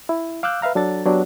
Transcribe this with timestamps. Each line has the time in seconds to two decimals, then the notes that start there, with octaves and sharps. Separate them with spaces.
0.09 E4
0.43 F5 D6 E6 F#6 G6
0.62 B4 E5 F5 A#5
0.75 F#3 D4 A4 A6
1.06 F#3 B3 D4 G4